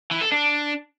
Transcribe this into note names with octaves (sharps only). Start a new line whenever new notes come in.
E3
A4
D4